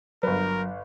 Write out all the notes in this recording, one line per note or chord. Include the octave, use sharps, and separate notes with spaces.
G1 F#3 A#4 B4